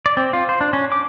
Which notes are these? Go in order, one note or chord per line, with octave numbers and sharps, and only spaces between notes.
D5
C4
F4
C5
D4
C#4
D6